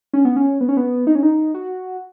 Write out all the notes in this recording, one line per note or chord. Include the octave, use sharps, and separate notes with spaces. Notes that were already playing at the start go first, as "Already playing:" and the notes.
C#4
B3
C#4
B3
C#4
B3
D#4
C#4
D#4
F#4